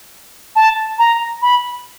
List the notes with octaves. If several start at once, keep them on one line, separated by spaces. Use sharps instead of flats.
A5
A#5
B5